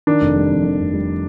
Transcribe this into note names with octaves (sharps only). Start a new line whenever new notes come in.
D#3 D4
F1
G3
F2
D#3
F1
G3